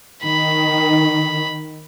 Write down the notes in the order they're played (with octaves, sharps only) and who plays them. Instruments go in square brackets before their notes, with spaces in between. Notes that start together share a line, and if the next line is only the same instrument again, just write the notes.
[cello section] D#3 [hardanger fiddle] B5